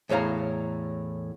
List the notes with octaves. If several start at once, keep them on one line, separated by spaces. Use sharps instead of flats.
E2 A2 C#5 F5 A#5